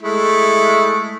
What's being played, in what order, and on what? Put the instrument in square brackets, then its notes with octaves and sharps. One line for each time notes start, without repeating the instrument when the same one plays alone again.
[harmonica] G#3 A3 E4